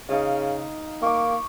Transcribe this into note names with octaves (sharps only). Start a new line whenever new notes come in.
C#3 D#4 F5
A#3 C#6 D6